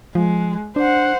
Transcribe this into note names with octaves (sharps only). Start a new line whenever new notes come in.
F3 G#3
D4 C5 F#5